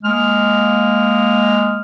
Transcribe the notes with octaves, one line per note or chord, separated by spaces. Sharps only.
G#3 A#3 F6